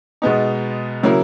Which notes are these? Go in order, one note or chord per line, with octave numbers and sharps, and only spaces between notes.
B2 G#3 B3 D#4
C#3 F#3 A#3 E4 A#4